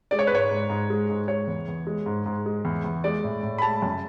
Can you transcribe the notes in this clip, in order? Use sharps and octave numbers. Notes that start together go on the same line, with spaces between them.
G#3 D5
C#5
B4
G#2 C#5
G#2
G#2
G#3
G#2
G#3 C#5
E2
E2
G#3
G#2
G#2
G#3
E2
E2
G#3 D5
A2
A2
B5
G#3 A5
F#2